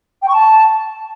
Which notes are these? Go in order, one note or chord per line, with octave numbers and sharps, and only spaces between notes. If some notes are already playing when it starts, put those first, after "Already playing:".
G5
C#6
A5